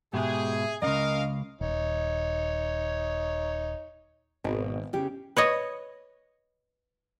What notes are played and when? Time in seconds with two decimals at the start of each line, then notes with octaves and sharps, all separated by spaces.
0.13 G#2 B2 G#3 G4 G#4 E5
0.82 C#2 F#2 C#4 A#4 D#5 F5
1.61 D#1 D#4 C#5
4.44 G#1 B2
4.93 C#3 G4
5.37 B4 C#5 D#5